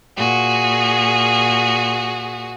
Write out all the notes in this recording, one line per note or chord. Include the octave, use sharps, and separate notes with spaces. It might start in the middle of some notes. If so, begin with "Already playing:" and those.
A#2 F#4 G#4